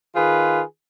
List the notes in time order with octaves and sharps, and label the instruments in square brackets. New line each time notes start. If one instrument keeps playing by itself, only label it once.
[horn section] D#3 F4 G#4 B4